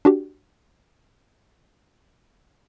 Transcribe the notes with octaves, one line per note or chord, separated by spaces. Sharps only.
D4 F#4 G4